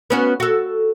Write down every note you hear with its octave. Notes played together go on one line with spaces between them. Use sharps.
B3 C#4 F#4
F#4 A4